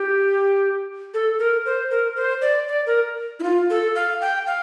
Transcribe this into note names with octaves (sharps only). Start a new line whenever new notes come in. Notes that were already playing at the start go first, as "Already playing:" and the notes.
Already playing: G4
A4
A#4
C5
A#4
C5
D5
D5
A#4
E4
F4
A4
F5
G5
F5